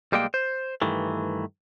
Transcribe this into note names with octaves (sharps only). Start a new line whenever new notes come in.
B1 G3 G#3 A#3 G5
C5
G2 D#3 E3 A3